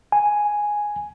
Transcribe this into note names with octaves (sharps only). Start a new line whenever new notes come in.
G#5